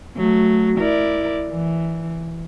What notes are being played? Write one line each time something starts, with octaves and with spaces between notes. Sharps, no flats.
F#3 A3
E4 A#4 D5
E3